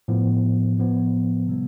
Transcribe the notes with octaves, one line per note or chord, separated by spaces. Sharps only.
A2 F3 B3
A2 F3 B3
C3 G3 B3